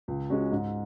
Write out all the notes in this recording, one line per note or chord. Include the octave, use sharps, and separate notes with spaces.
C#2
C#3 G#3 C#4 F#4
G#2